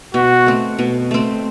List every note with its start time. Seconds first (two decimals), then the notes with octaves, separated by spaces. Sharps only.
0.14 B2 F#4
0.46 A3 C4
0.79 B2
1.11 A3 C4